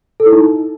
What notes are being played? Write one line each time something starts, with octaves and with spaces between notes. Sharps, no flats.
A4
E4
D#4